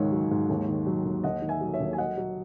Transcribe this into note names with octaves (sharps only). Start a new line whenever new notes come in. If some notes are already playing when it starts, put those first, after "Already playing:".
Already playing: C#2 G#2 D#3 C#5
F#3
G#2
D#2
D#3
F#3
D#2
D#2 D#5 F#5
D#3
E5 G#5
F#3
C#5 E5
D#2
G#5
F#3 D#5 F#5
F#3